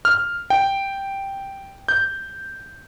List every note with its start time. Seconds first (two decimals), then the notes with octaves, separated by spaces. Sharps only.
0.05 F6
0.50 G5
1.88 G6